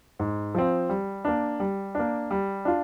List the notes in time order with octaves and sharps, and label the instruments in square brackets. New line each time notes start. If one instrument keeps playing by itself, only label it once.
[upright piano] G#2
F3 C4
G3
A#3 D4
G3
A#3 D4
G3
D4 F4